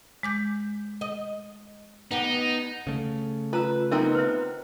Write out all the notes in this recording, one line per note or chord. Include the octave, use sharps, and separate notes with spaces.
G#3 D6 G6
D#5
B3 D#4 G4
C#3 A3
F4 B4 A#5 E6
B3 C4 D#4 E4 A#4 E5
B4 C5 E5